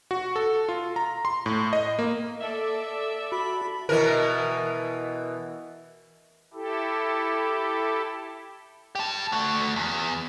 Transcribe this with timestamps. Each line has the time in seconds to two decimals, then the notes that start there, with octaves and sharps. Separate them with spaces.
0.11 F#4
0.36 A4
0.69 F4
0.96 A#5
1.25 C6
1.46 A2
1.73 D#5
1.99 A#3
2.41 A4 D5 E5
3.32 F#4 B5
3.89 B2 E3 A#4
6.54 E4 G4 A4
8.95 G4 A5
9.32 A3 F#4
9.76 E2